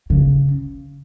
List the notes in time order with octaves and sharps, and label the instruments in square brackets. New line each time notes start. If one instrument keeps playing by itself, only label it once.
[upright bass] C#3